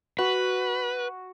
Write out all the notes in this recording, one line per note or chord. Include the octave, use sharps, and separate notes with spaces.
F#4 B4